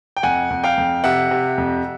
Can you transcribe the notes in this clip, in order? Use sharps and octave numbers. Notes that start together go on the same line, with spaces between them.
G5
F2 F#5 G#5
F2
F5 G5
F2
C3 E5 F#5
C3
F2